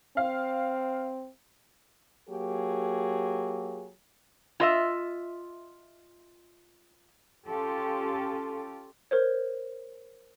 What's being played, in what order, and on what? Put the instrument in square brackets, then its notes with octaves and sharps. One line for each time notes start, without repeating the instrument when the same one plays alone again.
[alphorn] C4 [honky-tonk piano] F5
[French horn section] F#3 A#3 G4 G#4
[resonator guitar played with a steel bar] F4 D#5 E5
[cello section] C#4 F4 G4 A4
[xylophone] A#4 C5 C#5